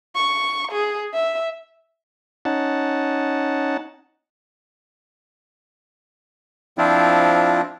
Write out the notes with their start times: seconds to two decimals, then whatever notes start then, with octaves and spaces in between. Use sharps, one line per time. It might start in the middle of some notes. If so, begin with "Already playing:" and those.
0.16 C#6
0.72 G#4
1.14 E5
2.45 C#4 D#4 F#5 A5
6.78 F3 C4 D4 E4 F4